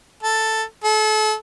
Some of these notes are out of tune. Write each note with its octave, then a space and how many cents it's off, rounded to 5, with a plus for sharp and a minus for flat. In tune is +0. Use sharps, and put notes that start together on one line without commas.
A4 +5
A4 -35